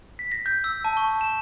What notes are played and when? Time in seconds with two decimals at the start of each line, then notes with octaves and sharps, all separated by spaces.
0.19 B6
0.32 A#6
0.46 G6
0.64 E6
0.85 A5
0.97 C#6
1.21 E7